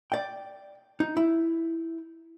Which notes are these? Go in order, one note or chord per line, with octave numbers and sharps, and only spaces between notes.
D5 G5
D#4
E4